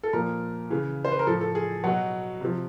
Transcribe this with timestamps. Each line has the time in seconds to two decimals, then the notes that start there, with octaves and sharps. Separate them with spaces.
0.03 A4
0.13 A#2 F3 A#4
0.70 C#3 E3
1.05 C5
1.12 B4
1.19 A#4
1.27 A2 F3 A4
1.41 A4
1.55 G#4
1.84 B2 F#3 F#4
2.41 C3 F3